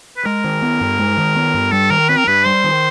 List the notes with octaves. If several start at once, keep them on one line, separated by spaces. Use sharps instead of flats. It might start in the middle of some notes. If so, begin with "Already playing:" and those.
B4
G#3 A#4
D#3
B3
G2
G#3
D#3
B3
G2
G3 A4
D#3 A#4
C4 B4
A#4
G2 B4
G3 C5
D#3